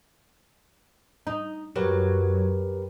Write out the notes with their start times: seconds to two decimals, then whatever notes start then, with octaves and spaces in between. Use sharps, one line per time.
1.27 D#4
1.76 F#2 F#3 G4 A#4 B4